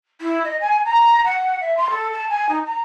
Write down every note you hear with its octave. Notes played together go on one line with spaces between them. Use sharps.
E4
D#5
G#5
A#5
F#5
E5
C6
A4
A5
G#5
D#4
A#5